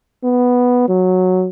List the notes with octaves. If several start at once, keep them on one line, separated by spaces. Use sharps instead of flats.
B3
F#3